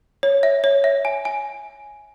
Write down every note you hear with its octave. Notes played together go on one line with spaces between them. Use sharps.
C#5
E5
C#5
E5
G#5
G#5